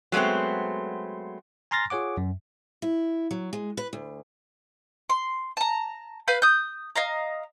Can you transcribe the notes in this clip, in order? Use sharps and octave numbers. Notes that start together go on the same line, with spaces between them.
F#3 G#3 A3 B3 C4
G#5 A#5 C6 F6 A6 A#6
F4 G#4 C#5 F#5 D6
F#2
E4
F#3
G#3
B4
D2
C6
A5 A#5
B4 F5 B5 G6
D#6 G6
D#5 F5 A#5